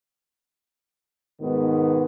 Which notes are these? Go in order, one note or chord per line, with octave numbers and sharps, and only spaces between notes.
G#2 B2 D#3 B3